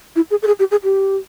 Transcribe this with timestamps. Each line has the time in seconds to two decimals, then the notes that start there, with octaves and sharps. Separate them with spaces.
0.16 E4
0.31 G#4
0.42 A4
0.47 G#4
0.59 G4
0.71 G#4
0.83 G4